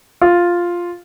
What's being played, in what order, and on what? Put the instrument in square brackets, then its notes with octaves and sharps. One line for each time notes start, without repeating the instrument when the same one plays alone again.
[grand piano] F4